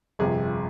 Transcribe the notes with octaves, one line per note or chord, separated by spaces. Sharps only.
G1 F2 C3 G#4